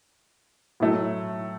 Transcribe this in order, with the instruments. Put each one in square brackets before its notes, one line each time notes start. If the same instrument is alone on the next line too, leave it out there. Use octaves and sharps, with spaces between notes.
[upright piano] A2 F#3 A3